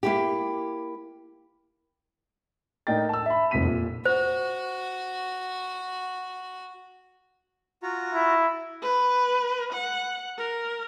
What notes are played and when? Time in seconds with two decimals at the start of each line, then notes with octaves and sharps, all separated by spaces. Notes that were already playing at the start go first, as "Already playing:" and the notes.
0.03 A#3 E4 G4
2.87 A2 D4 D#4 A#4 G5 A6
3.09 A5 E6
3.26 E5 B5
3.51 F1 C2 F2 C4 B6 D#7
3.64 A#2
4.05 F#4 C5
7.83 F4 F#4 A#5
8.14 E4
8.82 B4
9.73 F#5
10.38 A#4